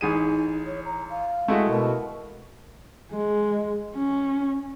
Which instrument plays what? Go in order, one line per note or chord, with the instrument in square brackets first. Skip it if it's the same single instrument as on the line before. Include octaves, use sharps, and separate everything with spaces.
[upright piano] A1 G#4 D#7 [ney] D#4
[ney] C#5
A#5
F5
[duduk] G#3 [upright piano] A3 E4 F#4
[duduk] B2 [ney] A#4
[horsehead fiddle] G#3
C#4